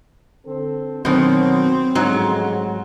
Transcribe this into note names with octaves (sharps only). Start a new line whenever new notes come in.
D3 C4 A4
B2 D#3 F#3 C4
A1 G#2 F3 F#3 G#3